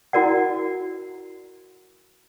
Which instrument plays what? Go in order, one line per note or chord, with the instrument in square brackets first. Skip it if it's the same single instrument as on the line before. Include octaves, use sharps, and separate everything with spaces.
[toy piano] E4 F#4 A#4 D5 F#5